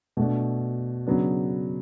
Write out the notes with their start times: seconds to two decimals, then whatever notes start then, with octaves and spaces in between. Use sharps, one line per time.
0.17 B2 A3 D4
1.06 C#3 F#3 B3 D4